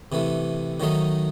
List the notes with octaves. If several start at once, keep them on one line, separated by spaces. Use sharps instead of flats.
C3 E3 A3
D#3 F#3 A3 D#4